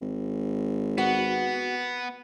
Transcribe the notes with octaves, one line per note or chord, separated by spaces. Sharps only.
G#1
B3 F#4